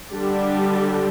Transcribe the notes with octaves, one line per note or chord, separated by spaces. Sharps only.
D3 G3 D4 G4